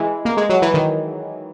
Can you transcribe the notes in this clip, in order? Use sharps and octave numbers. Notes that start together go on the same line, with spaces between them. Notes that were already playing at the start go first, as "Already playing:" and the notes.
Already playing: E3 G#3 E4
A#3
G#3
F#3
E3
D#3